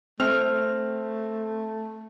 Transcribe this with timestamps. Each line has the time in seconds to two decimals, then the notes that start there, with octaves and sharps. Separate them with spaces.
0.20 A3 C4 F6